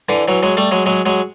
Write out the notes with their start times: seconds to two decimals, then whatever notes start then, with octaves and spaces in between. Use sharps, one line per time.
0.09 D3 E3
0.28 E3 F#3
0.43 F#3 G#3
0.57 G3 A3
0.71 F#3 G#3
0.86 F#3 G#3
1.06 F#3 G#3